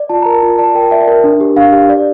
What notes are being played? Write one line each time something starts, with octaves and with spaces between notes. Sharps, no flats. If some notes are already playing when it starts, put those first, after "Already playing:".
Already playing: D5
F4 A5
A#4 A#5
A5
F4
D5 A5
A#4 G5
D5 E5
A#4
D4
G4
D4 F5
G4
D5